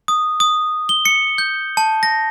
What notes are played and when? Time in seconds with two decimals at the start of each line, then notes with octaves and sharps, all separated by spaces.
0.08 D#6
0.40 D#6
0.89 G7
1.05 C#7
1.38 G6
1.77 A5
2.03 A#6